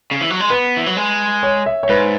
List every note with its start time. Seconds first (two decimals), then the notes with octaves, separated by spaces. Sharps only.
0.11 C#3
0.21 E3
0.30 F#3
0.40 G#3
0.49 B3 B4
0.77 E3
0.86 F#3
0.97 G#3
1.43 C#5
1.66 E5
1.83 C#5
1.89 G#2 B4